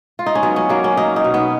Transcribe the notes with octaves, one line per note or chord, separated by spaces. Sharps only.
F4
D#4
C#4
F#3 B3
C#4
F#3 A#3
C#4
F#3 D#4
D#4
B2
B3